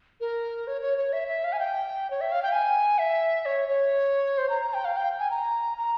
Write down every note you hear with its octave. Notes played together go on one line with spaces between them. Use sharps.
A#4
C#5
C#5
C#5
E5
E5
F5
G#5
G5
C#5
E5
F5
G5
G#5
E5
C#5
C#5
C5
A#5
A#5
G5
F5
G5
G#5
A#5
A#5